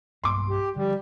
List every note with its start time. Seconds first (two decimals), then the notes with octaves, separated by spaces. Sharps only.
0.24 B1 G2 A#3 C6 D6
0.49 G4
0.76 D3 F3 G3